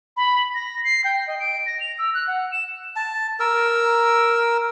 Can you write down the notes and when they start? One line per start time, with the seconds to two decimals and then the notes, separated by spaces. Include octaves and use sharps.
0.17 B5
0.54 A#6
0.84 C7
1.04 G5
1.27 D#5
1.40 D7
1.66 A#6
1.80 F7
1.99 E6
2.14 F#6
2.28 F#5
2.52 E7
2.96 A5
3.40 A#4 E6